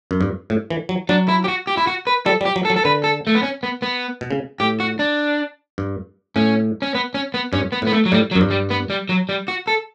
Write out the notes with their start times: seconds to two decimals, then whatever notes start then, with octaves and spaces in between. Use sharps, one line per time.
0.11 F#2
0.21 G2
0.50 A2
0.70 E3
0.89 F#3
1.09 F#3 D4
1.28 E4
1.44 G4
1.48 F#4
1.67 G4
1.77 E4
1.87 F#4
2.07 B4
2.26 G3 A4
2.41 G3
2.45 G4
2.56 F#3
2.65 A4
2.70 F#3
2.76 A4
2.85 D3 B4
3.04 A4
3.27 A3
3.35 B3
3.43 C#4
3.63 B3
3.82 B3
4.21 B2
4.31 C#3
4.60 A2 G4
4.80 F#4
4.99 D4
5.78 G2
6.36 A2 C#4
6.82 C#4
6.95 B3
7.14 C#4
7.34 B3
7.53 G2 C#4
7.72 B3
7.82 A2
7.87 B3
7.92 A3
8.06 F#3
8.12 A2 G3
8.31 F#3
8.36 F#2
8.41 G2
8.50 G3
8.70 B3
8.90 G3
9.09 F#3
9.29 G3
9.48 F#4
9.68 A4